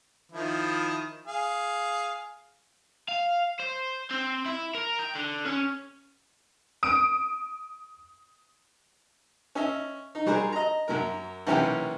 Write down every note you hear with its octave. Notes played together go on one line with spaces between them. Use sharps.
D#3 F3 E4
G#4 F5
F5
C5
C4
E4
A#4
G5
D3
C#4
D#6 D7
C#4 D#5 E5
D#4
F#3 G3 G#4 A#4 C5
D#5 A#5
F#2 F#3 A#4
B1 C3 E3 A#3 C#4 G5